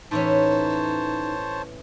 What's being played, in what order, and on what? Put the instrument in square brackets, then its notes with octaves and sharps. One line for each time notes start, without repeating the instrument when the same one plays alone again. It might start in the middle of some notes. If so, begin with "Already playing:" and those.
[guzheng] A2 E3 C#4 [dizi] D#4 [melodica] C5 C#5 A5